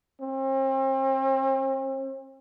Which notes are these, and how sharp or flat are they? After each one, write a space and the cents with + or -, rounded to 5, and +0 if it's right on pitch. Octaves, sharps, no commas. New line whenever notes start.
C4 +40